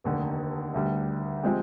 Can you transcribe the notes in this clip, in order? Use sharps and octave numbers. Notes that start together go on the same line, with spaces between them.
F1 D#2 D3
D2 D3 G3
F3 G#3 C4 G4